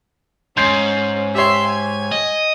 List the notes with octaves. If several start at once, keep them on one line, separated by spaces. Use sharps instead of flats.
G#2 C#4 C6 G6 C7
G4 C#5 E5 C6
G#5
D#5